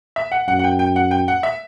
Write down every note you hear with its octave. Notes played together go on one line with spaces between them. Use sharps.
E5
F#5
F#2 F#5
F#5
G5
G5
F#5
G5
F#5
E5